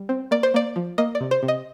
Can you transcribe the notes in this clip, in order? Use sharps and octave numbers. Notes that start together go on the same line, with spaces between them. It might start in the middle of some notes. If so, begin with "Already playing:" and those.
Already playing: G3
C4
A#3 D5
C5
A#3 D5
F3
A#3 D#5
D5
C3
C5
C3
D#5